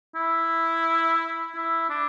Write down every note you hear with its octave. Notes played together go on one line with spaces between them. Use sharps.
E4
E4
D4